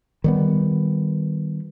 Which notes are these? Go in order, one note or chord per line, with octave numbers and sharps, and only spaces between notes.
D#3 G3 B3